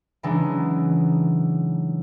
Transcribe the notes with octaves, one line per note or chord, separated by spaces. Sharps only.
C#3 E3 F#3 G#3 D4 D#4